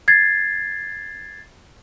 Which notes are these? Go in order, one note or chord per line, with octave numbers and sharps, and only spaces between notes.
G#6 A6 C7